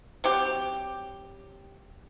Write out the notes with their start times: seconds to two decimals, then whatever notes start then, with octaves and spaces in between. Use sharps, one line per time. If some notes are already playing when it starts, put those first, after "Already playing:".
0.24 F#3 C4 G4